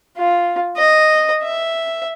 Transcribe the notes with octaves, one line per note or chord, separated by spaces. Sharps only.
F4
D#5
E5